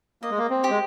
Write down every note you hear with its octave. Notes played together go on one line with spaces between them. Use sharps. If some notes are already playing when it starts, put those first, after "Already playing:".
A#3 D#5
G#3
A#3
C4
G4
G#3